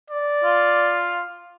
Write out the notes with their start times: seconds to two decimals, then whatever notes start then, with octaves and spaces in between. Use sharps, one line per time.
0.10 D5
0.44 F4